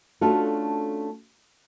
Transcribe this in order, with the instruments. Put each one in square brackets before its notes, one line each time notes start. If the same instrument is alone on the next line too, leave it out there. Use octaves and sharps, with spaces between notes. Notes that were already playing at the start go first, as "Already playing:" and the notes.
[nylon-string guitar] A3 C#4 D4 F4 F#4 A4